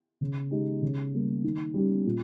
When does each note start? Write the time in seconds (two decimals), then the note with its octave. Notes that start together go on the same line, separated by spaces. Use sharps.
0.21 C#3
0.51 G#3 D#4 G4
0.82 C#3
1.13 G3 A#3
1.44 D#3
1.74 G3 C#4 G4
2.06 A#2